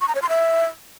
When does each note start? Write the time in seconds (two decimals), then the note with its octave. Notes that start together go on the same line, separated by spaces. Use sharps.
0.01 C#6
0.08 A#5
0.15 C#5
0.22 C6
0.29 E5